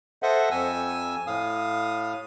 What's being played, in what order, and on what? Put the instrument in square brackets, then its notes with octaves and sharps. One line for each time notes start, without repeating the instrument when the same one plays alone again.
[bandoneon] A4 C5 D#5 E5 F#5
F2 G#5 E6
A2 F5 D#6